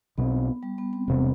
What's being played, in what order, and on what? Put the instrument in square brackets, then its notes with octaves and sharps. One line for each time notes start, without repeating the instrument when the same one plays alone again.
[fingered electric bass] B1 B2 G3 C4 [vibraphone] B3
[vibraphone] G3
B3
C4
[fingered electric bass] E1 C3